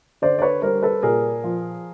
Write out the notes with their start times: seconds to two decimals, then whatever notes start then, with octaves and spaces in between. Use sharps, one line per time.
0.22 D3 C5 D5
0.38 D5
0.42 B4 C#5
0.62 G3 A#4 C5
0.83 A4 B4
1.03 A#2 G#4 A#4
1.44 F3